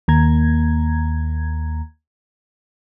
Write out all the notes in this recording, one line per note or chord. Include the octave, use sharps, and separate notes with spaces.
D#2 A#3 A#5 G#6